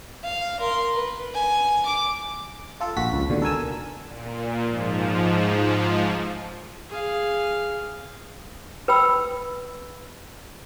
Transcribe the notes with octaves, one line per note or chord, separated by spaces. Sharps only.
F5
A#4 C6
B4
G#5
D6
F4 A4
A#1 F#4 B6
C#2
D#2 B2 D3
A4 A#4 G#5 E6
A#2
G#2 F3
G#4 F5
B4 G5 B5 E6